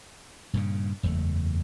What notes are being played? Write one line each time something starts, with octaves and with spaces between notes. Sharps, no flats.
G2 A#2 C#3
F#1 E2 A3